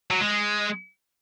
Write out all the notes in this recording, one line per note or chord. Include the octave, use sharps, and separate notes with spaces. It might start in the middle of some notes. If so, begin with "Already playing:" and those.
F#3
G#3